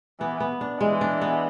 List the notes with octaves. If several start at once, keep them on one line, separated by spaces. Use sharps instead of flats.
E3 B3
B3
D4
E3 G#3
D4
B3